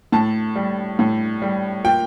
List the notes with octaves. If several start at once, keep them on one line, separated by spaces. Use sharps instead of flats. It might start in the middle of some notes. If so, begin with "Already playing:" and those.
A2 A5
G3
A2
G3
A#2 G5